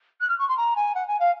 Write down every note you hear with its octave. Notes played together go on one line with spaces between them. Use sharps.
F#6
F6
C#6
C6
A#5
G#5
F#5
G#5
F5